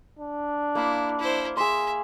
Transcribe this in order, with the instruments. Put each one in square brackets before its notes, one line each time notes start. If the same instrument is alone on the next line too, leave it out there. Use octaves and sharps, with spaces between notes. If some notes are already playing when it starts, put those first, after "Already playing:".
[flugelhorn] D4
[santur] A#3 F5 B5 [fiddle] E4
[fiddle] E4 C5
[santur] G#4 C6 [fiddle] E5